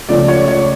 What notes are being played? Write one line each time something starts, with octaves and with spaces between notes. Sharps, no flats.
C#2 C#3 F3 A3 D5
C#5
C#5